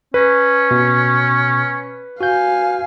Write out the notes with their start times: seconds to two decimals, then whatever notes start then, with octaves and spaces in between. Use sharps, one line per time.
0.14 C#4 B4
0.71 B2
2.21 F#4 F5 G#5 G6